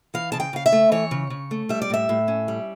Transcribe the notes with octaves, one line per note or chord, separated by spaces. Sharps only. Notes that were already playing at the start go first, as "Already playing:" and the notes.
E3 F5
C#3 A5
G5
C#3 F5
E5
A3
E3 C#5
C#3
C#3
A3
G3 E5
D5
A2 E5
A2
C#4
G3